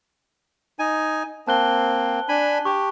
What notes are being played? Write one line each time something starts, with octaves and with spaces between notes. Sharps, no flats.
D#4 G#5
A#3 C4 A5 F#6 G7
D4 G#5 B5
G4 C#6